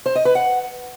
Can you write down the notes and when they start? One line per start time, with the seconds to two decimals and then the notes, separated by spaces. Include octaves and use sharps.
0.06 C5
0.15 D#5
0.25 B4
0.35 F#5